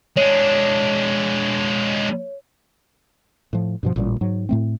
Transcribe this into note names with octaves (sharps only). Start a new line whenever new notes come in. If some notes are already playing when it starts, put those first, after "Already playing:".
G#3 D4 C#5
A2 F3
G2 B2 F3
A1 A#2 G3
G#2 F#3
A2 A3 C4